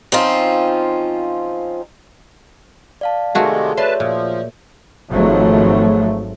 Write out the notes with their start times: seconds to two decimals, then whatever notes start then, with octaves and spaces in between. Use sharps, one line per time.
0.12 F3 C4 C#4 D#4 F4
3.01 D5 F5 A5
3.35 C3 D#3 G#3 A3 F#4 G#4
3.77 B4 C#5 D5 E5 A5 C6
4.00 A#2 F3
5.09 G#1 G#2 F3 F#3 A3